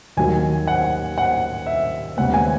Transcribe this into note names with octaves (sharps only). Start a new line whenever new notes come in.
D#2 D#3 F#3 G#5
F#5
F#5
E5
D#2 C#3 G#3 B3 F#5
G#5